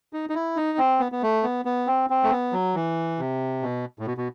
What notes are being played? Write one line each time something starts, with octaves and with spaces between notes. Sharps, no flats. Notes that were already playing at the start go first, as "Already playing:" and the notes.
D#4
D#4
E4
D#4
C4
B3
B3
A3
B3
B3
C4
C4
A3
B3
F#3
E3
C3
B2
A2
B2
B2